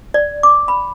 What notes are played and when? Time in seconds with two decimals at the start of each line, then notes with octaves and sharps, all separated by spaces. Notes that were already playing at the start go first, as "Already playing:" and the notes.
0.14 D5
0.43 D6
0.68 B5